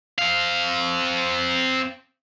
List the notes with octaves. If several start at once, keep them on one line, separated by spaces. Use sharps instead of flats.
C4 F5